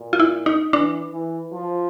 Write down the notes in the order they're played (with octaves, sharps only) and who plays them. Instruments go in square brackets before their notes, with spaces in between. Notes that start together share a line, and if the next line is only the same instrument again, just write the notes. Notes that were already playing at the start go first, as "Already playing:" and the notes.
Already playing: [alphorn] A#2
[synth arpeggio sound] F4
E4
D#4
[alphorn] E3 [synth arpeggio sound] D4
[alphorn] E3
F3